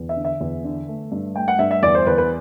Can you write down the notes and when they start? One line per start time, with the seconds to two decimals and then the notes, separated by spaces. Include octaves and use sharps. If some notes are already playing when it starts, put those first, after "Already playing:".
Already playing: E2
0.09 E5
0.16 D3
0.25 E5
0.41 E2
0.64 D3
0.88 A3
1.12 G2
1.35 A3 G5
1.48 F#5
1.59 G2 E5
1.71 E5
1.83 E2 D5
1.95 C5
2.07 E2 B4
2.18 B4